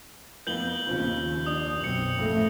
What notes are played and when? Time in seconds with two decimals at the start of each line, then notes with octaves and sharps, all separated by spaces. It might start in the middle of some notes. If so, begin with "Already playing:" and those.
0.47 F2 B3 G6 F#7 G7
0.87 D#2 C#3 F3 C4
1.46 D4 D#6
1.80 B1 F#2 C4 C#7 F#7
2.19 A1 F2 A3